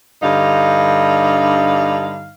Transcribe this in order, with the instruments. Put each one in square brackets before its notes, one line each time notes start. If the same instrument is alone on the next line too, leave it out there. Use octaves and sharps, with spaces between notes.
[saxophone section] G2 D3 D#4 F5